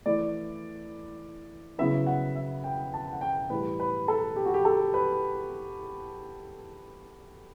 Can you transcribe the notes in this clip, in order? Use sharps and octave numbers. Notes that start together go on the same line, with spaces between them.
E3 A3 E4 D5
C#3 F#3 B3 E4 E5
F#5
E5
G5
A5
F#5
G5
A2 E3 G3 B4
B4
A4
G4
F#4
G4
A4
B4